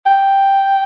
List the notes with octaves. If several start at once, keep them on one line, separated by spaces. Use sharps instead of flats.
G5